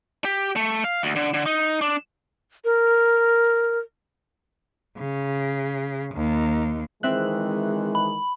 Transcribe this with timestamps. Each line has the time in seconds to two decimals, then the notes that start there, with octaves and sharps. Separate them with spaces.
0.25 G4
0.56 A3
0.84 F5
1.03 D2
1.16 D3
1.34 D3
1.46 D#4
1.81 D4
2.65 A#4
4.97 C#3
6.14 D#2
7.03 D#3 E3 G#3 C4 E5 F#6
7.95 B5